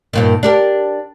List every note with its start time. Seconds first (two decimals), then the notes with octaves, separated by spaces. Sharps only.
0.13 G2 A#2 D#3
0.43 D4 G4 A#4